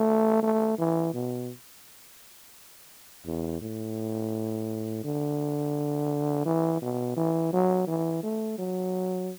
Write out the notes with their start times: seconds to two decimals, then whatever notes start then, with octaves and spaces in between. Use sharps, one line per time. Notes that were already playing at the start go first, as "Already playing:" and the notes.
Already playing: A3
0.43 A3
0.78 E3
1.14 B2
3.26 E2
3.61 A2
5.04 D3
6.46 E3
6.82 B2
7.17 E3
7.53 F#3
7.88 E3
8.23 A3
8.58 F#3